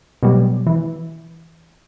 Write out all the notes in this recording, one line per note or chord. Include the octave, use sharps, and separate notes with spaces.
B2 F#3 G3
E3